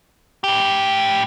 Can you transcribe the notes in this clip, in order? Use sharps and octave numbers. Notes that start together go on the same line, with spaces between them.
A2 G4